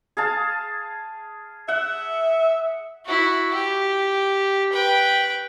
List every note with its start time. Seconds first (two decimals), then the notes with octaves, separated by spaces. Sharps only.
0.17 G#4 F5 A5
1.68 E5 F#5
3.05 E4 F#4
3.54 G4
4.73 B4 G5